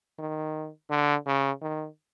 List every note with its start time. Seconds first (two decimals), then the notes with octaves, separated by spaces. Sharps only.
0.19 D#3
0.90 D3
1.26 C#3
1.62 D#3